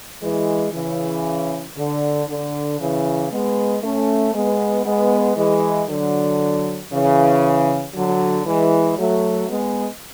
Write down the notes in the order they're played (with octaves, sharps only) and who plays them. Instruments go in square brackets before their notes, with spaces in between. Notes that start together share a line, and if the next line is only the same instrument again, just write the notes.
[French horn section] E3 G#3
C#3 E3
D3
D3
C#3 E3
G#3 B3
A3 C#4
G#3 B3
G#3 B3
E3 G#3
D3 F#3
C#3 E3
D3 F#3
E3 G#3
F#3 A3
G#3 B3